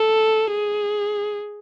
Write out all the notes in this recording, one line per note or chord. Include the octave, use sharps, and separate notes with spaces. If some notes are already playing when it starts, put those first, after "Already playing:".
Already playing: A4
G#4